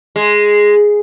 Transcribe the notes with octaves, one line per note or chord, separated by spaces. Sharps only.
G#3